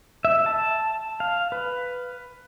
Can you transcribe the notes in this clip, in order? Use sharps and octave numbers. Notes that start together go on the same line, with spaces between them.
E5
A5
F5
B4